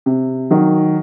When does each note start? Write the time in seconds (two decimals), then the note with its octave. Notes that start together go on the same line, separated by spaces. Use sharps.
0.06 C3
0.51 D#3 F#3